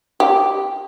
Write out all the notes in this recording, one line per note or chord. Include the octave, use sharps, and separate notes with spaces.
G4